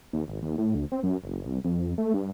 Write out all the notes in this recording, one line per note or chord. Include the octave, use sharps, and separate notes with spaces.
D#2
G#1
D#2
A2
D2
C4
F#2
F#1
C2
F2
A3
G2